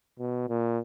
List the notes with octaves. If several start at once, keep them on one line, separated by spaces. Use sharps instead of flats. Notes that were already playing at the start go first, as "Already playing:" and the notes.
B2
A#2